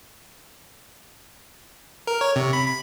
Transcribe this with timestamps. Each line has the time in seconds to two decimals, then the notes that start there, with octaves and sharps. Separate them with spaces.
2.07 A#4
2.21 C#5
2.36 C3
2.53 B5
2.66 B5